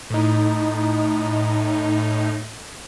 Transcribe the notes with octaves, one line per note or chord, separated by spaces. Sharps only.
A2 D#4